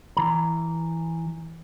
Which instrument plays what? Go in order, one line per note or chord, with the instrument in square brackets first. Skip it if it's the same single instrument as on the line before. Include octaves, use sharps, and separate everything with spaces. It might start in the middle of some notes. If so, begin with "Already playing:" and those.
[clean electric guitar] E3 A#5